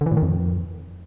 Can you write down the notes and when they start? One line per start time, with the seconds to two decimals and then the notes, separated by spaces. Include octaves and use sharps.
0.01 D3
0.06 E3
0.12 A2
0.17 D#3
0.22 F2